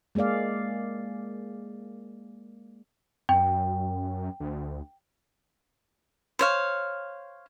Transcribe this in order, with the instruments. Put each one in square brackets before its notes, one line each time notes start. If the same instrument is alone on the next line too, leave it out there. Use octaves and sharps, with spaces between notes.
[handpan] G#3 A#3 G#4 D5 F5
[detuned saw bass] F#2 [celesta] G5
[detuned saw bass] D2
[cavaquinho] C5 C#5 F5